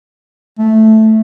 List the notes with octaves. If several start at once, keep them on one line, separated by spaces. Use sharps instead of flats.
A3